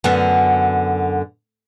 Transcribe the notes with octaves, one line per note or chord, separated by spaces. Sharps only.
F#2 D3 B3